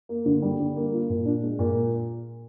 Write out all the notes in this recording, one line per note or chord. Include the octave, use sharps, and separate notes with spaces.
A#3
D3
G3
D3
A#3
F4
A#2
D4
G#3
A#2